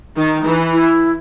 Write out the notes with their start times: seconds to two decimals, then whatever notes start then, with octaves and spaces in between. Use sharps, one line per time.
0.16 D#3 D#4
0.45 E3
0.72 E4